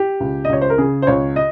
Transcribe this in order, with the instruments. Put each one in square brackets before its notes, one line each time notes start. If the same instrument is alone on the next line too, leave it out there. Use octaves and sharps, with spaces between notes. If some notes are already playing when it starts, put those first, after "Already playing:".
Already playing: [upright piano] G4
C#2
D#5
C#2 C#5
C5
A#4
C#3 G#4
C5
C#2 C#5
D#5